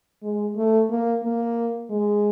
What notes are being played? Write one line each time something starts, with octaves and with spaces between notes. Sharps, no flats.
G#3
A3
A#3
A#3
G#3